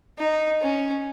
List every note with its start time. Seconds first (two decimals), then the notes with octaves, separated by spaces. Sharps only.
0.18 D#4
0.61 C#4